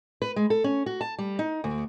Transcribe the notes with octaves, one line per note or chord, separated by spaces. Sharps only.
B4
G#3
A4
C#4
F#4
A5
G3
D#4
D2